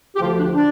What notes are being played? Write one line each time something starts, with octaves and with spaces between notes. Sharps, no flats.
G4
D2 D3 F3 F4
D4
D4